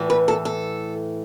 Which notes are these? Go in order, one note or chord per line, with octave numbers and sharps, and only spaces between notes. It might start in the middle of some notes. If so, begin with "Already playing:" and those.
Already playing: A2 E3
B4
A4
A4